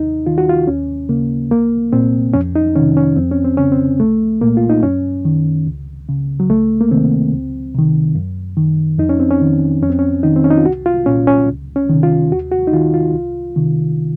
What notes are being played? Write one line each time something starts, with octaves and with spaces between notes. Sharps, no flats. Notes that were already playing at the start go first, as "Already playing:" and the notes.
Already playing: D#2 D#4
D#3 F4
F#4
F4
D#2 C#4
C#3 A#3
C2 A#3
A#2 C4
F2 C#4
D#4
C3 D#3 C#4
C#4
F2 C4
C#4
C4
C#3 C#4
C4
C2 A3
A#2 A#3
F4
D#4
F#2 C#4
D#3
C#2
C#3
F#3
C#2 A3
A#3
C3 D#3 C4
C#2
C3 D#3
F#2
D#3
F2 D#4
C#4
C4
C#4
D#3
F2 C#4
C4
C#4
D#3 D#4
C4
C#4
D#4
F4
C2 F#4
F4
A#2 C#4
C#4
C#2
C#4
C3 D#3
F4
D#2 F#4
F#4
D#4
D#3 F4
F4
C2
C3 D#3